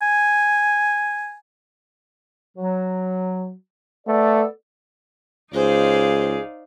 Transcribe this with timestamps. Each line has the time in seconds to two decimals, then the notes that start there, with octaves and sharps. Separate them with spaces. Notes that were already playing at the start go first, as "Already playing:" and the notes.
0.02 G#5
2.57 F#3
4.07 A3 B3 A4 D5
5.54 C#2 D#4 G#4 C5 D5 F5